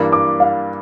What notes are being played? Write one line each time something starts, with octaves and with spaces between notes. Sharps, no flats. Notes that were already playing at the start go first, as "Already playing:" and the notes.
Already playing: G2 E3 A#3 D4
D6
F5